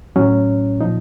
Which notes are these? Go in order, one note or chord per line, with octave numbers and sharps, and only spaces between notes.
A2 F#3 C#4
A#2 F3 D#4